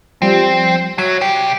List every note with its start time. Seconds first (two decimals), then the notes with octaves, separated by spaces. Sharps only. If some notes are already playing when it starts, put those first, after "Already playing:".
0.22 F3 G3 C4
0.98 F#3 F#4 E5
1.21 C2 G4 C7